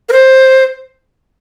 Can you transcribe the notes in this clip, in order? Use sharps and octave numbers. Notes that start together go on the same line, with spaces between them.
A#4
C5